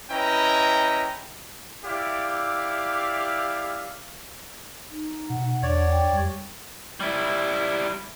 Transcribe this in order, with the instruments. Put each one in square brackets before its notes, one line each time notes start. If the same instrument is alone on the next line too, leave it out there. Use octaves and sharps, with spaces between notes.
[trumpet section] C#4 E4 B4 D#5 G5 A#5
E4 G4 D5 E5 F5
[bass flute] D#4
[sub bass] B2 [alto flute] F#5
[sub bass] E2 [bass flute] D4 [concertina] C#5 D5
[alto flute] G5
[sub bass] F2 [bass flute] G3
[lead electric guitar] G3 E4